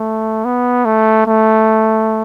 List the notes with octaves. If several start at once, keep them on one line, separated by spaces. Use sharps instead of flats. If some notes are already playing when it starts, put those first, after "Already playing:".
Already playing: A3
B3
A3
A3